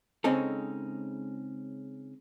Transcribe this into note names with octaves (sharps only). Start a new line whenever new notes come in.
C#3 G#3 C4 C#4 D#4 A4